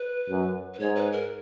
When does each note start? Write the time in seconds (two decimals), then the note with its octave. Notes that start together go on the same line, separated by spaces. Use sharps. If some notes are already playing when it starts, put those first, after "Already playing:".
Already playing: B4
0.29 F#2
0.74 B4
0.79 G#2 C#5
0.96 B4
1.12 A#4